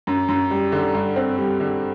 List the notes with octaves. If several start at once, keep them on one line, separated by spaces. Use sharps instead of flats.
F#2
F#2
G3
D3
G2
C4
G3
D3